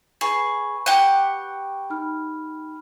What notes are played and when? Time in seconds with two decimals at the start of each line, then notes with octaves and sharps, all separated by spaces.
0.21 G#4 B4 B5 C#6
0.86 G4 F#5
1.90 D#4 B5 F6